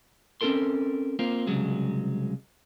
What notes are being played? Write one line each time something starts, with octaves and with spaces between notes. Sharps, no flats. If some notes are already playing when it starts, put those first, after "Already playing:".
C4 C#4 F4 A4 A#4 C6
A#3 C4 F4
C2 C#3 F#3 G#3